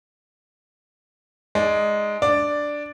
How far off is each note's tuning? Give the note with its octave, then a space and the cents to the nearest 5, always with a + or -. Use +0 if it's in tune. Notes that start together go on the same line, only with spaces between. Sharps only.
G#3 +0 D#4 +0 D5 +0
D4 +0 D5 +0